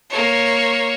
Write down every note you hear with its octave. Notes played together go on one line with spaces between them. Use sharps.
A#3 C#5